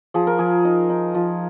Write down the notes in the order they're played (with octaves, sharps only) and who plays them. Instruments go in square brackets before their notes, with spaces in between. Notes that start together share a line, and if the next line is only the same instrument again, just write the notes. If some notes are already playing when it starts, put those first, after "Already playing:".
[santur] F3 G#4
A#4
F3 G#4
D#4
D#4
F3